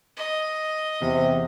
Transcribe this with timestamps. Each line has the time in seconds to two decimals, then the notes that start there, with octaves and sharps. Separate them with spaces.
0.17 D#5
1.02 E2 C3